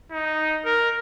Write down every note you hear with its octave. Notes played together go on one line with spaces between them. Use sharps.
D#4
A#4